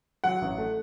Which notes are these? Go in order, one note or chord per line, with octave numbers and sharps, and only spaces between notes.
F#3 F#5
A1
A3